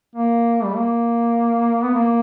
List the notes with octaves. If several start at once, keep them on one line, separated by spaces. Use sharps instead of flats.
A#3
G3
A#3
B3
A#3